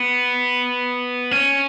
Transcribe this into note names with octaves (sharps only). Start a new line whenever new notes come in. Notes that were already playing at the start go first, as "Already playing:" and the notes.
Already playing: B3
C#4